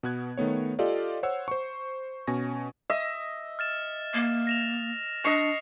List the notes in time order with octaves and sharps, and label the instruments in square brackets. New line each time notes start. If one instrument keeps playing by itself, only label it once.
[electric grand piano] B2 B3 F#6 G#6
D#3 A3 B3 C#5
F4 G4 A4 D5 D#5 F5
C5 C#5 F#5 E6
C5 C#6
B2 C#4 G#5 C#6 A#6
[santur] D#5 E5
[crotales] F6 A6 E7
[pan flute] A#3
[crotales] A#6 E7 F7
[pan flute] D4 [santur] D#5 C#6 [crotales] C7 C#7 F7